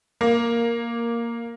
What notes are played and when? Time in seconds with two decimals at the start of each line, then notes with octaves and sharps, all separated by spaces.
0.21 A#3